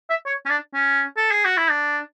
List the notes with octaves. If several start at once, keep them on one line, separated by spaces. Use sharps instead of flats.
E5
C#5
C#4
D4
C#4
A4
G#4
F#4
E4
D4